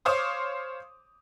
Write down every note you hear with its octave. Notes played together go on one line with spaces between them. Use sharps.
C5 C#5 F5 C6 D6 D#6